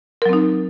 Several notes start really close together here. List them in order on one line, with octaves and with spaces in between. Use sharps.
A#4 F#3 C4 D#4